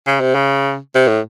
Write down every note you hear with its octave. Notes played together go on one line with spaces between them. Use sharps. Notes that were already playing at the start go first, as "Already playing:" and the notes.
C#3
C3
C#3
C3
A2